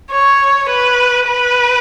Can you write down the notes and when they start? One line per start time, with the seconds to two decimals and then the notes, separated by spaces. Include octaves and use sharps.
0.11 C#5
0.69 B4
1.27 B4